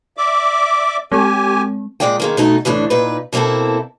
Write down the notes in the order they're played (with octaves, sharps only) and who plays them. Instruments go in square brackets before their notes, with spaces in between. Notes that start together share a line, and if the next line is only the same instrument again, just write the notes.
[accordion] D5 E5 D6
[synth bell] G#3 C4 [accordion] G4 G#5
[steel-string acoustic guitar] A#2 C#3 G#3 D5 D#5 G5
D#3 G#3 A#3
B2 A3 D#4
D2 A2 E3 D4
A#2 D#4 B4
B2 A#3 C4 E4 A4